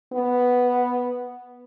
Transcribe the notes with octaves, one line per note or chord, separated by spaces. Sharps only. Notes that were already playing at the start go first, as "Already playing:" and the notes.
B3